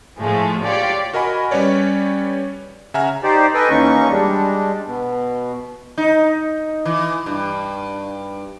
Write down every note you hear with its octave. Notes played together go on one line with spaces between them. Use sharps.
A2 F3 G#3 A3
F4 G4 C#5 D5
F#4 A#4 D#5 G#5 B5
G3 C#4 B4 C#5 D5
C#3 E5 F#5 G#5 A#5 F6
D#4 G4 C5 D5
A4 B4 D#5 G5 G#5
D#2 E3 A#3 C#4 D#4 C#6
G3 G#3 D4
B2
D#4
E3
G2